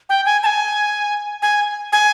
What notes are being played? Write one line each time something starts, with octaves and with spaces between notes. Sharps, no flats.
G5
G#5
A5
G#5
G#5
G#5